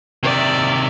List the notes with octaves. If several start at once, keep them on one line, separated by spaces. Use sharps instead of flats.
C3 D#3 D5 E5